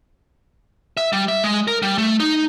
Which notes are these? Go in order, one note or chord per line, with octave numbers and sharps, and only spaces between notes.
E5
G3
E5
G#3
A#4
G3
A3
D#4